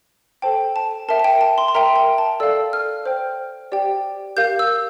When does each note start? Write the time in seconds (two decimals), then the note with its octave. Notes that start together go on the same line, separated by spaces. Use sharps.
0.42 A4 C5 G5 A5
0.76 A5
1.09 A#4 E5 G5 A5
1.20 A5
1.24 G5
1.41 A5
1.58 C6
1.68 C6
1.75 A#4 E5 G5 A#5
1.96 G5
2.18 A5
2.40 A4 D5 F5 E6
2.73 F6
3.05 C5 G5
3.72 G4 D5 G5
4.37 G4 A#4 F5 G6
4.59 E6